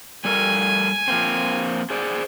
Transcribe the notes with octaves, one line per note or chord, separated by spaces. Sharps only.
G3 A4 A#4 G#5
F3 A#3 C4
G#4 C5 D5